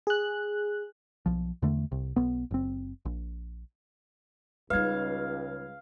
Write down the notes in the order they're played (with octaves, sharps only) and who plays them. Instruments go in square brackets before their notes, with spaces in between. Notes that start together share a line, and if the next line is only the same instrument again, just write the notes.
[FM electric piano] G#4 F#6
[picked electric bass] B1 F3
E2 D3 A3
C2
B1 B3
F#1 C4
A#1
[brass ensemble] C#2 [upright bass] G3 D#4 [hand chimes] B4 G#6 [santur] F5